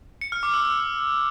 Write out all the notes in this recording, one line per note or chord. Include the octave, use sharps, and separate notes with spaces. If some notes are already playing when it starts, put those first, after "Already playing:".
C#7
F6
D6
E6